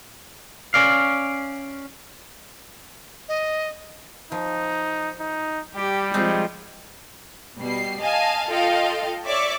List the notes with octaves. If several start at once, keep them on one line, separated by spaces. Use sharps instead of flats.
C#4 D5 F5
D#5
F3 D#4
D#4
G3 G4
F3 G#3 C4 D#4 G#4
B2 G3 C7
D#5 F5 G#5 A5
F4 A4 D#5 F5 G5
C#5 D5 E5 C#6 D6